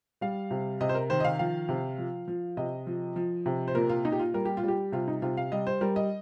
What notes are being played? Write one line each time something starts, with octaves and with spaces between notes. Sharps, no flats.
G3 F5
C3
C3 D#5
C5
A#4
D#3 C5
D#5
F5
F3 F5
C3
F3
F3
C3 D#5
F3
F3
C3
C5
A#2 A#4
F4
A#2 D#4
G4
F4
G3 A#4
G4
F4
G3
G4
C3 F4
D#4
C3 F4
F5
G3 D#5
C5
G3 A#4
D#5